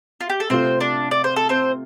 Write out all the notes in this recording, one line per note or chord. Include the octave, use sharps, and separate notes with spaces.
F4
G4
A4
C3 A3 C4 F4 C5
D4 D5
D5
C5
A4
C4 C5